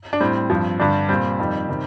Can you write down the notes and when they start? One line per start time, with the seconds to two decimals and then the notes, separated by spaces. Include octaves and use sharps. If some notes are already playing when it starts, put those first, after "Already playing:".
0.13 D4
0.20 A2 G3 C4
0.50 G2 F3
0.79 G2 D3 G3 D4
1.09 A#2 G3 C4
1.39 F2 D#3 G3
1.69 C3 D#3 G3